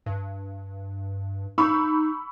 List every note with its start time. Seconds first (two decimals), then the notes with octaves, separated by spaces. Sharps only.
0.06 G2
1.58 D#4 B5 C#6 E6